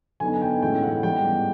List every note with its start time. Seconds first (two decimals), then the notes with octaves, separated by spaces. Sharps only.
0.20 D3 F#3 B3 D#4 G#5
0.42 G5
0.62 A2 E3 G#3 C#4 E4 G5
0.83 F#5
1.03 G#2 E3 G3 B3 G5